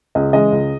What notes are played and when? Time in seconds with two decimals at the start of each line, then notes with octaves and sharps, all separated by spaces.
0.15 C#2 D#5
0.33 C#3 E3 G#3 D#5
0.52 C#2